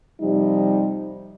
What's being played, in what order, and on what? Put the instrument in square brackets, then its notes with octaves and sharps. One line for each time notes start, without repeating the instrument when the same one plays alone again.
[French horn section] C3 F3 G3 D#4